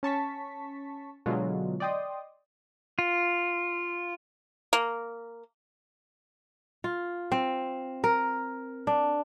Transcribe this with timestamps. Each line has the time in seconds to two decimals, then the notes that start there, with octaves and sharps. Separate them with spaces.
0.03 C#4 A5 C#6 B6
1.26 B2 D3 F#3 G#3 F4
1.80 D5 D#5 G5 C6 D#6
2.99 F4
4.73 A#3
6.84 F4
7.32 C4
8.04 A#4
8.87 D4